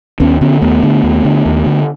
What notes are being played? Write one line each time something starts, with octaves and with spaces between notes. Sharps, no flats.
D#2 B3 C#4
D3 B3 C#4
D#2 A3 B3
D3
D#2
D3
D#2
D3